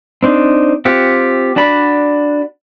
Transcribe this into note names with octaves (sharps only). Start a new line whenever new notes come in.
C4 D4 D#4
C4 F4 G4 F#5
D4 F#4 D5 B5